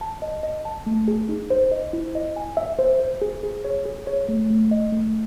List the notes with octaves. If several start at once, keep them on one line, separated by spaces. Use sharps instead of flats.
A5
D#5
D#5
A5
A3
G#4
D#4
C5
D#5
E4
D#5
G#5
E5
C5
C5
G#4
G#4
C#5
G#4
C#5
A3
A3
D#5
A3